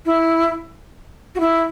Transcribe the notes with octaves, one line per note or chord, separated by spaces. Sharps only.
E4
F#4
E4